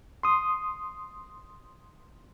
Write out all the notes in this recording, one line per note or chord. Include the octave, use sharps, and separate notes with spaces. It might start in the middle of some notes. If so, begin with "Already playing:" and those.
C6 D#6